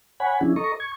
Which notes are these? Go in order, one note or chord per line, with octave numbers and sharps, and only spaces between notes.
C#5 F#5 G#5 B5
F3 C#4 D4 E4 G#4
A4 D#5 A#5 C#6
C#6 G#6